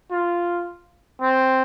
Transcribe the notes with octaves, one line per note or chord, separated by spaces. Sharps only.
F4
C4